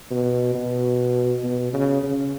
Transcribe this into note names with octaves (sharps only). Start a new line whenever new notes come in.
B2
B2
B2
C#3
C#3